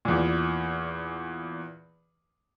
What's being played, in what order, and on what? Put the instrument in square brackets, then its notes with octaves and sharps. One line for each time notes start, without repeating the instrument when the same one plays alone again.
[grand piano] E2 A#2